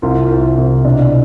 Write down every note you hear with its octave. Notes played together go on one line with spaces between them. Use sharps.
C2 F4
C2
C3
B2 D4